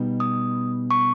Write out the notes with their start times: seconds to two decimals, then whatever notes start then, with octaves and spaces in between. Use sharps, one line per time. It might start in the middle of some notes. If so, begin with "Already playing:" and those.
Already playing: B2 G3 B3 D#4
0.20 D#6
0.91 C#6